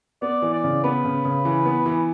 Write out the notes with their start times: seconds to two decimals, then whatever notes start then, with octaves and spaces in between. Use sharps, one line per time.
0.22 B3 D5
0.42 E3
0.53 D5
0.64 C#3
0.84 B3 B4
1.05 C#3
1.25 C#3
1.45 E3
1.66 B3
1.86 E3